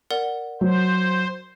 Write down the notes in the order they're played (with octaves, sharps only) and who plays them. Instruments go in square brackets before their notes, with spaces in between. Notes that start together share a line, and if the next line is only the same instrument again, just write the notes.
[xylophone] A#4 D5 F#5
[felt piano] F#3 [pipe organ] C5